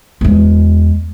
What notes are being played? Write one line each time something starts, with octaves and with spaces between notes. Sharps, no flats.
E2 G#3